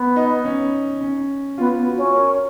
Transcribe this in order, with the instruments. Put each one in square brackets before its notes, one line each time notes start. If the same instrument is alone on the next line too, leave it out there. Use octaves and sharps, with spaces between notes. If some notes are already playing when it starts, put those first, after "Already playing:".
Already playing: [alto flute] B3
[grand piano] D#4
C#4
C#4
[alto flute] B3 [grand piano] F4
[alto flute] B3
[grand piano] F#4
[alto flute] C#4
[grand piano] A#4